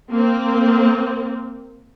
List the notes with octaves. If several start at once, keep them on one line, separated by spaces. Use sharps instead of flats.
A#3 C4